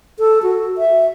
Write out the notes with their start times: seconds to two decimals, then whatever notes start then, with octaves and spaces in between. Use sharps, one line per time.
0.19 A4
0.43 F#4
0.78 E5